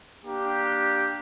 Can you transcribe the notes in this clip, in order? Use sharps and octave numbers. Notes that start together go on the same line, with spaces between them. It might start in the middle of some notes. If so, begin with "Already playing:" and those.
A#3 D4 G4